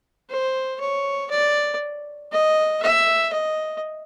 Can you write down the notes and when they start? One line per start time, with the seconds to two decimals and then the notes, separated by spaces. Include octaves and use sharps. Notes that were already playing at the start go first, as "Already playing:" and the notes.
0.30 C5
0.80 C#5
1.30 D5
2.32 D#5
2.82 E5
3.33 D#5